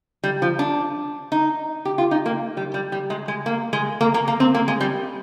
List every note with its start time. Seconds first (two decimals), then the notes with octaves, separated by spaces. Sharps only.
0.24 G3
0.42 F3
0.59 D4
1.32 D#4
1.85 G4
1.98 F4
2.11 D#4
2.26 A#3
2.57 G3
2.74 G3
2.92 G3
3.10 G#3
3.28 G#3
3.46 A#3
3.73 G#3
4.01 A#3
4.14 A#3
4.28 A#3
4.40 C4
4.55 A#3
4.68 G#3
4.81 G3